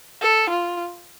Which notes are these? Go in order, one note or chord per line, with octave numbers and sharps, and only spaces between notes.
A4
F4